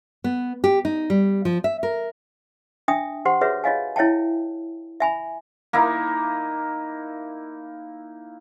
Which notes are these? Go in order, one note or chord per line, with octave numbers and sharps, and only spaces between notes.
B3
G4
D#4
G3
F3
E5
A#4
D4 E5 G5 D#6
G4 C5 F#5 C6
F#4 G#4 B4 C#5 E5
F4 C#5 D#5 F5 G#5
E4 C#5 E5 G5 A5
E5 G#5 B5
A#3 D#4 E4